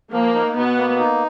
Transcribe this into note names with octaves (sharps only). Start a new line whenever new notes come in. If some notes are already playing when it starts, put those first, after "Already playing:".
F3 A#3
D#4
B2 B3
A#3
D#4